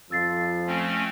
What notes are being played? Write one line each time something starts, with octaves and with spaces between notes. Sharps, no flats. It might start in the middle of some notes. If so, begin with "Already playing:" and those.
F2 F3 E6 A6 C7
A3 C4 C#4